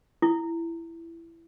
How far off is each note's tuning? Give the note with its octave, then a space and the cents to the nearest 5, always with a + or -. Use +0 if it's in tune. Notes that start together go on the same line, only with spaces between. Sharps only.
E4 +10